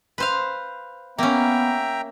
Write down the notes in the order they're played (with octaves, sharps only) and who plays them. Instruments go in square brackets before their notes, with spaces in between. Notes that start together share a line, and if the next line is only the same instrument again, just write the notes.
[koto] B4 C5 F5
[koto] A#3 C#4 [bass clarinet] B3 [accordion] E5 G5 A#5